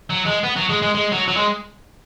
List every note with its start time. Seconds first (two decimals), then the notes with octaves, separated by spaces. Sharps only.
0.10 F#3
0.26 G#3
0.44 B3
0.56 F#3
0.69 G#3
0.82 G#3
0.95 G#3
1.12 F#3
1.28 F#3
1.36 G#3